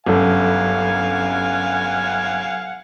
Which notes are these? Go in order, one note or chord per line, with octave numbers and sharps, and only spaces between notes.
G1 C2 F#2 F#3 A4 F5 F#5 G#5